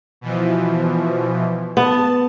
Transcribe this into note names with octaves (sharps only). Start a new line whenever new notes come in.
B2 E3 F3
B3 A5